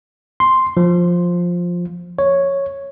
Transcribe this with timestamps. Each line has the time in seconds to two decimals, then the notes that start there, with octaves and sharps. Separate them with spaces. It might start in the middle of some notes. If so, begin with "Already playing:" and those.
0.40 C6
0.77 F3
2.19 C#5